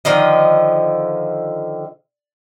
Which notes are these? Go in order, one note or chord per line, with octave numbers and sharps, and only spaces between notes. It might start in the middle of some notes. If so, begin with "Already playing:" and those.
D3 D#3 F3 D#5